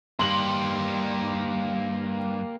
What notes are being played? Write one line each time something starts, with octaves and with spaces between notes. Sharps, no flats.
G2 A#3 G4 C6 F#7